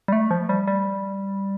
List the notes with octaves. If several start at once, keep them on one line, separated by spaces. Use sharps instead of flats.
G3
A3
F3
G3
G3